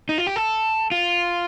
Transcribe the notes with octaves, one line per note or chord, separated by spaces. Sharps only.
D#4
F4
G4
A4
F4